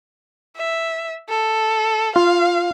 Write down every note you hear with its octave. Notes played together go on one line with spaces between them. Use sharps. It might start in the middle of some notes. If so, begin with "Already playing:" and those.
E5
A4
F4 F5